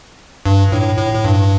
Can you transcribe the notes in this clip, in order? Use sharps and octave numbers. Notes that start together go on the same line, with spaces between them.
G2
A2
A2
A2
G2